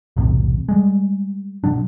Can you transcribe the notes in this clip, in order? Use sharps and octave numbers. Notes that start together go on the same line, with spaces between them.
B1 E2 A2 C3
G3 G#3
B2 F#3 D4